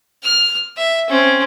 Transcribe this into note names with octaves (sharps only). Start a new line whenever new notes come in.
F6
E5
C4 C#4